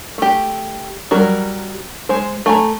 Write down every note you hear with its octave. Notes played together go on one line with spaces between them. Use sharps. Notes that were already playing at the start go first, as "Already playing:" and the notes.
A3 G4
F#3 G3 A#4
G#3 C5
A3 G#5 A#5